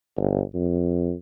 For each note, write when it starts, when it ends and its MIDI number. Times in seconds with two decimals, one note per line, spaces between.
0.17 0.41 31
0.55 1.13 41